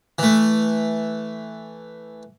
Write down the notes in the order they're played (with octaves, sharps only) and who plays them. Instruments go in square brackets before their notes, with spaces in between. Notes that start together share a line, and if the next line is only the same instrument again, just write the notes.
[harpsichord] E3 A3